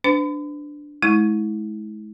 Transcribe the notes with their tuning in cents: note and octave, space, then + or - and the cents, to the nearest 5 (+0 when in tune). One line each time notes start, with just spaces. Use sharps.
D4 +0 B4 +45
G#3 +40 E4 -30